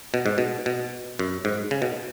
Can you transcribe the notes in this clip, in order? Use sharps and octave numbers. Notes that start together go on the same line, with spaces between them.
B2
G#2
B2
B2
F#2
G#2
C#3
B2